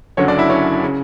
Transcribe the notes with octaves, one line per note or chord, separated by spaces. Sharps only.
F#1 F#2 D3 F#3 C#4 C#5
D4 D5
E4 E5
C#4 C#5
C#3